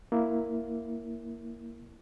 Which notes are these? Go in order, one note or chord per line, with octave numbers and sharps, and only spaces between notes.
A#3 E4